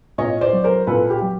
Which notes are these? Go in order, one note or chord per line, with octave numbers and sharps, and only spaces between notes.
A#2 C#5 D#5
C5 D5
F#3
A#4 C5
A#2 A4 B4
G4
F#3